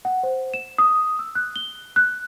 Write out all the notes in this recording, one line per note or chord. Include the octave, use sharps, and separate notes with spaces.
F#5
C5
E7
D#6
E6
F#6
G7
F#6